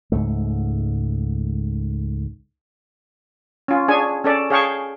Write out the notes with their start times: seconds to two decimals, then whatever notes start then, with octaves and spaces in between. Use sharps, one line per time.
0.12 C#2 G#2 A3
3.68 C#4 F4
3.88 D4 G#4 C#5 G#5
4.24 C#4 A4 D5
4.50 G#4 C#5 F5 G5 A5 C#6